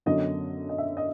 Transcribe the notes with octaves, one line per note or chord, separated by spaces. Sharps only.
F#2 D3 F#3 B3 D4 D#5
D#5
E5
D#5